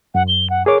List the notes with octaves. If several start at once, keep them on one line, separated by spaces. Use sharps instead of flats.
F#2 F#5
G7
F#5
G#4 A#4 C#5 D6